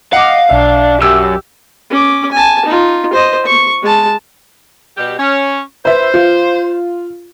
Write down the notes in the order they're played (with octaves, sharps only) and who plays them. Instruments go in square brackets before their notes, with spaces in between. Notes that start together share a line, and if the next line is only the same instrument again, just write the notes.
[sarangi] D#5 [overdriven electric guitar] F5 [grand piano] F#5 D6
[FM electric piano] B1 E5 [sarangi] D4
[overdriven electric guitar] F#2 [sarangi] G4 [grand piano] E6
[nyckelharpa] C#4 D6
G#5 A5
D#4 F4
C5 D#5
C#6
G#3 A5
[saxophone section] B2 G3 G4
C#4
[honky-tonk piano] B4 E5 [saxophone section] C5
[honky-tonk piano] F4